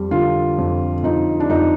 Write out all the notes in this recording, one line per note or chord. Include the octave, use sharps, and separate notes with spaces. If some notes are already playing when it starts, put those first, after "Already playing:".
Already playing: F2 G3
D3 F4
F2
F2 D#4
D4
F2 D#4